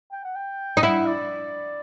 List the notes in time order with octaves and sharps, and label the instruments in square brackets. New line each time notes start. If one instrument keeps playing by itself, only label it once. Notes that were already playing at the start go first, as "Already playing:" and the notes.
[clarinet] G5
F#5
G5
[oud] D#4
[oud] E4 [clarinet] F#5
[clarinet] D5